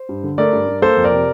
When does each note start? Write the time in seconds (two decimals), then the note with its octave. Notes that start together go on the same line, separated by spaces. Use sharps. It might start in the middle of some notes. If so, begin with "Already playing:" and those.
Already playing: C5
0.09 G2
0.24 D3
0.38 A3 A#4 D5
0.53 G2
0.68 G2
0.82 A#3 A4 C5
0.97 F2
1.04 A#4 D5
1.12 C3